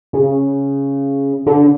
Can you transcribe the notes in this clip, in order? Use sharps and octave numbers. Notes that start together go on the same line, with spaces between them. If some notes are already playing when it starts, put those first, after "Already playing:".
C#3
D3